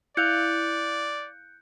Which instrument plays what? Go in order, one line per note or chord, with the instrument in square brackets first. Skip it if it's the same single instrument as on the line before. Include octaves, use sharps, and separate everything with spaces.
[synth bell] E4 F5 [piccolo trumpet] D5 [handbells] F#6 G6 C#7